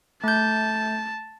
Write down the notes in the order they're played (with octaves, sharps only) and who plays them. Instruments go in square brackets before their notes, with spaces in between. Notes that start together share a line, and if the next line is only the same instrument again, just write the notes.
[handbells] A3 G6 [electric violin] A5